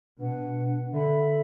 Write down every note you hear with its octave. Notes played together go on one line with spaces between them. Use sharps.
B2 D4 B4 F#5
D3 A4 E5 B5